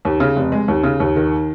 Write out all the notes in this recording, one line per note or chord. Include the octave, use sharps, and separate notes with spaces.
D#2
C#3
F1
G#3
D#2
C#3
D#2
D#3